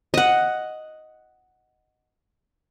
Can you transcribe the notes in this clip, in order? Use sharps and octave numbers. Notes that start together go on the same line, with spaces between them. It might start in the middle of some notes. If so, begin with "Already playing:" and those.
D#5 F#5